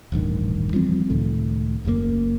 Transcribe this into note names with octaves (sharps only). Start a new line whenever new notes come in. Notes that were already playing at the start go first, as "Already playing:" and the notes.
D#1 A1 G2 D#3
E3 F3 G3 C4
C#2 A2 D#3 A3
F#1 F#2 A2 A#3